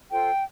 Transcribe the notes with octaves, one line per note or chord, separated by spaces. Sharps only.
F4 A4 C5 G5